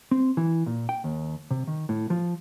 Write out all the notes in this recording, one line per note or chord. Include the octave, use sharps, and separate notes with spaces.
C4
E3
A#2
G5
D#2
C3
D#3
A2
F3